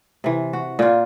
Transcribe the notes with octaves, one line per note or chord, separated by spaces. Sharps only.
C3 E3
F#4
A#2 F4